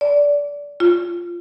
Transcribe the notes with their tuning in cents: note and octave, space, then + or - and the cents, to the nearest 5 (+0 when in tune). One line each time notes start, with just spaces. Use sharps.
D5 -20
F4 -10